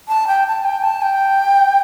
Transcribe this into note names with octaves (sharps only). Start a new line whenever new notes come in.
A5
G5
A5
G5
A5
G5